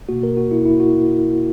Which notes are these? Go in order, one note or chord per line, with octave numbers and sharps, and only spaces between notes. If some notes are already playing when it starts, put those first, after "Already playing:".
B2 A#3 F#4
A#4
F#4
E4
E4
F#4